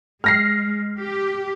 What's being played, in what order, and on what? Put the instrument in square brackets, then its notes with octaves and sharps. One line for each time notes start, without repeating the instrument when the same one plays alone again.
[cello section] G#3 [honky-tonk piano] F6 A#6 C7
[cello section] G4